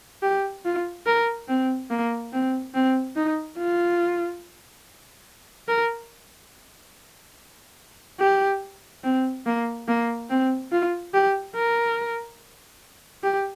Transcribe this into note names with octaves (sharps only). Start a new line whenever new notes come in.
G4
F4
A#4
C4
A#3
C4
C4
D#4
F4
A#4
G4
C4
A#3
A#3
C4
F4
G4
A#4
G4